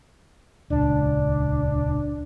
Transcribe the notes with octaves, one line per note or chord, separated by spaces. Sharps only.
D#1 C#2 D4